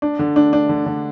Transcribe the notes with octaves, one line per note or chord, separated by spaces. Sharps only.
D4
D3
D4
D4
D3
D3